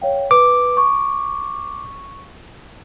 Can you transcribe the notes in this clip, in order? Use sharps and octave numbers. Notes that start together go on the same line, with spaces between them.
C#5 F5 G5
B4 D6
C#6